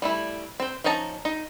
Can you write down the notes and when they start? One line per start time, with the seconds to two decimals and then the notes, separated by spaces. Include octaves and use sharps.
0.02 G3 A3 E4
0.60 C4 C5
0.84 F3 C#4 D#4 A5 A#5
1.25 D#4